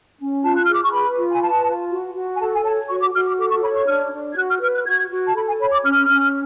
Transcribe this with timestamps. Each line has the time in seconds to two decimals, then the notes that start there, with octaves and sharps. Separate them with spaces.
0.19 C#4
0.43 F4 A5
0.55 F#6
0.63 G#4 F6
0.73 D6
0.82 C#6
0.92 B4 B5
1.17 F4
1.31 G#5
1.41 B4 A5
1.66 F4
1.90 F#4
2.15 F#4
2.35 G#5
2.39 A4 A5
2.52 G#5
2.64 C#5 A5
2.89 F#4 C#6
3.01 D6
3.14 F#4 F6
3.26 D6
3.38 A4 D6
3.50 C#6
3.62 C#5 B5
3.75 C#6
3.87 D4 F6
4.13 D4
4.32 G#6
4.36 F#4 F#6
4.49 F6
4.61 B4 F6
4.74 F#6
4.86 F#4 G#6
5.10 F#4
5.26 A5
5.35 A4 B5
5.47 G#5
5.59 C#5 B5
5.72 D6
5.84 C#4 F6
6.09 C#4